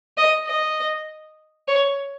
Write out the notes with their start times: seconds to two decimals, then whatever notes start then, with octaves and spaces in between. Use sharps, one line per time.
0.18 D#5
0.47 D#5
1.68 C#5